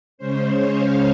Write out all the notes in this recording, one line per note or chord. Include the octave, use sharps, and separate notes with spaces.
C#3 G#3 C#4 C5
C#5
F5